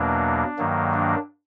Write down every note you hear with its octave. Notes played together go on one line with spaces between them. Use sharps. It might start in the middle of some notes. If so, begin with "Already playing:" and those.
Already playing: E2 B2 F#3 A#3 D4
G2 D#3 F#3 A#3
D4